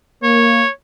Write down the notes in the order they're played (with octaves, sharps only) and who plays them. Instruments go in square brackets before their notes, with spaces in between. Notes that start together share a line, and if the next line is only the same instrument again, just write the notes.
[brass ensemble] A#3 [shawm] C#5